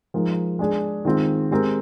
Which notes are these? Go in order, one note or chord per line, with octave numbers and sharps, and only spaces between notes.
F3 G#3 D#4 A#4
G#3 D4 G#4
D#3 G#3 C4 F4
G#3 C4 G4 A#4